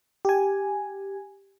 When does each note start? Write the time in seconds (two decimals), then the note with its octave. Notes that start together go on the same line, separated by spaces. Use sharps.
0.25 G4 G#5